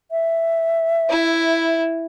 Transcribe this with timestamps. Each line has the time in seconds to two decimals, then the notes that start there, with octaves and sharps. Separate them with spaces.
0.11 E5
1.10 E4